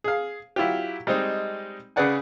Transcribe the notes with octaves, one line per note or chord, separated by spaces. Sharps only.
G#4 F5
F#3 E4 F4 G4
G3 G#3 C4 D#4
C#3 G#4 B4 D5 F#5 G#5